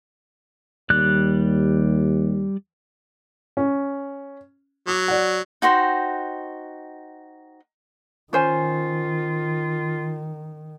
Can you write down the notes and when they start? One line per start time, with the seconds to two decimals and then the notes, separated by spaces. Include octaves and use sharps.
0.90 D#2 G3 D5 F#6
3.57 C#4
4.87 F#3 D6
5.08 D5 F#5
5.62 D#4 F#4 C5 G5
8.33 D#3 C#4 F4 C5 G#5